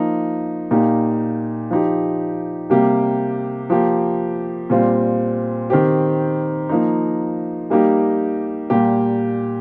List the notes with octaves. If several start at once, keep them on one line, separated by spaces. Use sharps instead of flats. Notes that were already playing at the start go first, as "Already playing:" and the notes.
Already playing: F3 A#3 D#4
A#2 A#3 D#4 G4
F3 D#4 G4
C3 G3 A#3 G4
F3 A#3 G4
A#2 G3 C4 F4
D#3 C4 G4
F3 A#3 D#4
G3 A#3 D#4 G4
A#2 G3 A#3 G4